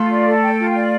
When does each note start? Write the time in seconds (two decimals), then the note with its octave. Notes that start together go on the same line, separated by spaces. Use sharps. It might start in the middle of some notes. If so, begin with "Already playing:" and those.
Already playing: A3 F4
0.09 D5
0.26 A4
0.42 G5
0.59 F4
0.75 D5